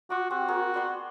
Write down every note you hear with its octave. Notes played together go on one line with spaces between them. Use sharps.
F4 F#4 D6
C4 F#4 G4 C5
A#3 F4 G#4
B3 D5 C6